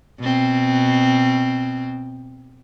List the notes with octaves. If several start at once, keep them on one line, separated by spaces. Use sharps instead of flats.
B2 C4